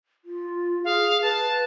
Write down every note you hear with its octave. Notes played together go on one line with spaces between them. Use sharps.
F4
G#4 F5
B4 A5